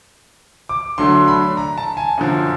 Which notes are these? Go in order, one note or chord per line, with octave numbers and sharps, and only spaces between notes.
D6
D3 F#3 A3 D4 C6
B5
A#5
A5
G#5
F#2 D3 F3